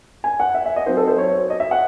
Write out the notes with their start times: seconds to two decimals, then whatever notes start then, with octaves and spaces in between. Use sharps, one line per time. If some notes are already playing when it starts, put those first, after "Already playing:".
0.24 G#5
0.40 F#5
0.55 E5
0.66 E5
0.76 D#5
0.86 F#3 C4 D#4 C5
0.97 A4
1.08 C5
1.18 C#5
1.50 D#5
1.60 E5
1.71 F#5